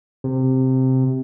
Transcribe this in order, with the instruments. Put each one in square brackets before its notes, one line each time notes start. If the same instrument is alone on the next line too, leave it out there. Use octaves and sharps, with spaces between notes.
[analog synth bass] C3